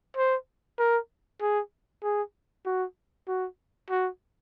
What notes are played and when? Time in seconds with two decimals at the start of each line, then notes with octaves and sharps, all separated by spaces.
0.17 C5
0.79 A#4
1.41 G#4
2.03 G#4
2.65 F#4
3.28 F#4
3.90 F#4